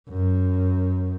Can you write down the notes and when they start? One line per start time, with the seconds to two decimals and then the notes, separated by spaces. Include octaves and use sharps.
0.08 F#2